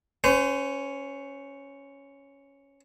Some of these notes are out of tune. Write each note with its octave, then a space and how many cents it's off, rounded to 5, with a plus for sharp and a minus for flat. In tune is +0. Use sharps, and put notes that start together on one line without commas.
C#4 +0 C5 -40